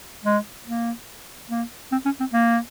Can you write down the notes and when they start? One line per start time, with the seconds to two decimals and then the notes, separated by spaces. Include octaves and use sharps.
0.25 G#3
0.66 A#3
1.50 A#3
1.92 C4
2.05 C#4
2.20 C4
2.33 A#3